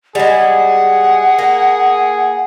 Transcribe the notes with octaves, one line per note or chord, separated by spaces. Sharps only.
G3 G#3 G#4 F#5
A#3